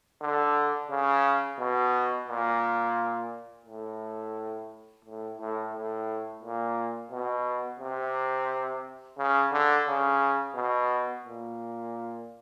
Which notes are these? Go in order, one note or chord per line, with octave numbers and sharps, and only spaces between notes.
D3
C#3
B2
A#2
A2
A2
A2
A2
A#2
B2
C3
C#3
D3
C#3
B2
A#2